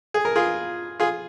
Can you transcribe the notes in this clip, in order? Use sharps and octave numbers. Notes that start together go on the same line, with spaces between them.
G#4
A#4
F4 G#4
F4 G#4